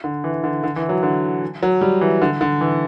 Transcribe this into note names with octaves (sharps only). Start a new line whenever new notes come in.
D3
E3
D3
D3
E3
F#3
D3
F#3
G3
E3
D3
D3
E3